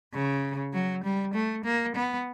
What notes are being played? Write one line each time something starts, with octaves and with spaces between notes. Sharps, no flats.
C#3
F#3
G3
A3
A#3
B3